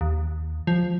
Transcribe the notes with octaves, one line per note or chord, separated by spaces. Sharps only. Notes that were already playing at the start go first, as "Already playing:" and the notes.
D#2
F3